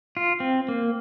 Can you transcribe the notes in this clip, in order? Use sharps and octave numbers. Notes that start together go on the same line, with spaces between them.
F4
C4
A#3